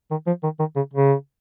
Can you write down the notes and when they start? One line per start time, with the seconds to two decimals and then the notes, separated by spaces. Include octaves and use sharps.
0.11 D#3
0.27 F3
0.43 D#3
0.59 D#3
0.76 C#3
0.94 C#3